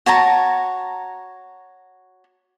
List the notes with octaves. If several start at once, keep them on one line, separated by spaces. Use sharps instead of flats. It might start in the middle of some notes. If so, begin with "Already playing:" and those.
F#4 C#5 A5 A#5